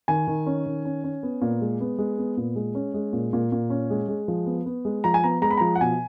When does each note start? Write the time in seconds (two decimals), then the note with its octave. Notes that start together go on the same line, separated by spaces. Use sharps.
0.08 D#3 G#5
0.27 D#3
0.46 C#4
0.66 D#3
0.85 C#4
1.04 C#4
1.23 B3
1.42 A#2
1.61 G#3
1.81 B3
1.98 G#3
2.18 B3
2.37 A#2
2.56 G#3
2.75 C#4
2.94 G#3
3.13 A#2
3.33 A#2
3.52 A#2
3.70 C#4
3.90 G#3
4.08 G#3
4.28 F3
4.46 B3
4.66 B3
4.85 G#3
5.04 F3 A#5
5.14 G#5
5.24 B3 A#5
5.42 G#3 A#5
5.51 B5
5.57 F3 A#5
5.75 F#5
5.81 B2 G#5